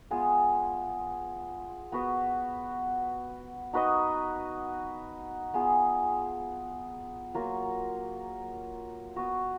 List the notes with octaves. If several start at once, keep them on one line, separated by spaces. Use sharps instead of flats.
G#3 B3 F4 G#4
B3 F#4 B4
D#4 F#4 B4 D#5
B3 F4 G#4
F#3 A#3 F4 A#4
B3 F#4 B4